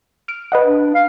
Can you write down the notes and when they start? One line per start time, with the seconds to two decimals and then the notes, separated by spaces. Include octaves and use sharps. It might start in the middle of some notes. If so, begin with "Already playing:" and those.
0.28 F6 D7
0.52 B4 D#5 F#5
0.64 D4
0.94 F5